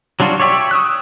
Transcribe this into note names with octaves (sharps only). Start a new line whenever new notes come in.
F#3 G3 D4 F4 F#4
C#5 D5 E5 G5 C#6
D#6 E6 F#6